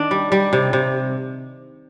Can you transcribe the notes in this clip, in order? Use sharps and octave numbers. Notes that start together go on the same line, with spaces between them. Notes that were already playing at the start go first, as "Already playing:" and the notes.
Already playing: D#3 D4
G3
G3
C3
C3